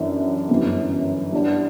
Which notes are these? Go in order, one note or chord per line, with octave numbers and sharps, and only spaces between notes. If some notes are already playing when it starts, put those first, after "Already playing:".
Already playing: F#2 E3 B3 D4
G1 F#2 E3
G2 E3 B3 D4